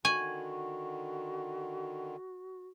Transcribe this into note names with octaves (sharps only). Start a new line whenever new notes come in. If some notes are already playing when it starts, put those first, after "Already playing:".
D3 D#3 F#4 G#5 C#6